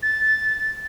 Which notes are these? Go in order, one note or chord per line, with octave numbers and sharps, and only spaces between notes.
A6